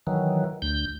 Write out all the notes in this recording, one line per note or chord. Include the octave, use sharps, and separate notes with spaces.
D#3 E3 F#3
D2 G6